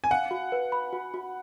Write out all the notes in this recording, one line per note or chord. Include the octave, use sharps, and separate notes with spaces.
G#5
F5 F#5
F#4
B4
B5
F#4
F#4